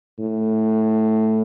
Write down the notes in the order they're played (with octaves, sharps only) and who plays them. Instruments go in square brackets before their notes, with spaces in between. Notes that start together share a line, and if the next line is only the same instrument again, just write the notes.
[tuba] A2